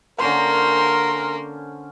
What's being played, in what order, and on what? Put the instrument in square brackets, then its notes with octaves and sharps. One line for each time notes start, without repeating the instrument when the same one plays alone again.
[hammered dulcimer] D3 C#4 C5 [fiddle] A#3 [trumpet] A#4 [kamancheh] C6